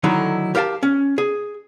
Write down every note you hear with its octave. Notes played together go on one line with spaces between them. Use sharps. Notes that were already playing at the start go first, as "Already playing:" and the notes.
D3 D#3 F#3 A3 D#4 E4
G4 A#4 F5 G5 A5
C#4
G#4